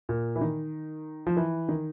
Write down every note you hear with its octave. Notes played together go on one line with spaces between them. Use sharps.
A#2
E3
D#3
F3
E3
D#3